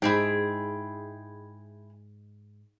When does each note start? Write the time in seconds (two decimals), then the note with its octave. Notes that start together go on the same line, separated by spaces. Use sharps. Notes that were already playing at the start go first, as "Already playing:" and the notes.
0.02 G#2 G#3 E4 G#4 G5